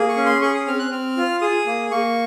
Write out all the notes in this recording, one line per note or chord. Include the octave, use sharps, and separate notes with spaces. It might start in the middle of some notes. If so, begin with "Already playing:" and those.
Already playing: A#3 G#4
C#6
C#4
C6
G#4 C#6
D#6
C4 F6
F#6
C4 F6
F4
G#4 D#6
A#3
A#3 C#6